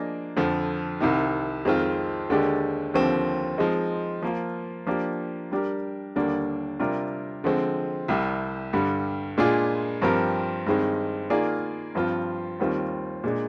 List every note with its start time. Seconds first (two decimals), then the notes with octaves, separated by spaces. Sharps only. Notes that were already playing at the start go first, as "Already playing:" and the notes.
Already playing: F3 A#3 D4 G#4 D#5
0.37 F2 D3 F3
1.01 C2 C3 D#3
1.65 F2 D#3 G#3 C4 F4
2.29 D#2 D3 G#3 D4 G4
2.94 D#2 D3 F3 C4 G4
3.58 F3 G#3 C4 D#4
4.22 F3 A#3 F4
4.87 F3 A#3 D4 G4
5.51 G3 D4 G4 A#4
6.16 D#2 D3 G3 A#3 D4
6.80 C3 G3 D4 F4 A#4
7.44 D3 F3 G#3 C4
8.08 C2 C3 G3
8.73 G2 D3 G3
9.38 A#2 G#3 D4 F4 G#4
10.02 G2 F3 C4 G4 A#4
10.66 G2 D#3 G#3 C4
11.30 D#3 A#3 F4 G#4 D5
11.95 G2 F3 C4 F4
12.60 D#2 D#3 G3 C4 F4
13.24 A#2 G#3 D4